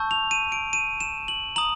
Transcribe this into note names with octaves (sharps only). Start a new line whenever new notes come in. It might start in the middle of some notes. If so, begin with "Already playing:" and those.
Already playing: A5 C#6 E6 G6
F7
D#7
D7
D#7
E7
F#7
A#5 D#6 F#7